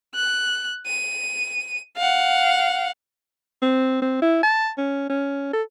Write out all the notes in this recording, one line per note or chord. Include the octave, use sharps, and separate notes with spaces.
F#6
D#7
F5 F#5
C4
C4
E4
A5
C#4
C#4
A4